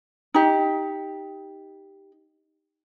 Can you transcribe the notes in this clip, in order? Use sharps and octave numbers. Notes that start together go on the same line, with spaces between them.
D#4 G4